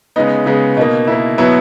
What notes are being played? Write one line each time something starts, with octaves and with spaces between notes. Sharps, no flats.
C#3 G#3 B3 D#4
C#3 G#3 B3
B2 A#3 D#4
B2 A#3 E4
B2 F#3 B3 E4